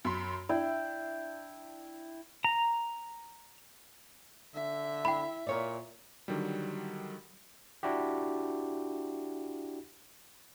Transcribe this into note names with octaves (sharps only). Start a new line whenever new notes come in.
F#2 B5 C6
D4 E4 E5 G5
A#5
D3 E5
E4 G5 B5
A#2 A#4 C#5 D5
D3 D#3 F#3 G3
D4 E4 F#4 G4